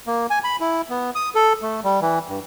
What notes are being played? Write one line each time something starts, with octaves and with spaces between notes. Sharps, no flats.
A#3
G#5
B5
E4
B3
D#6
A4
A3
G3
E3
G2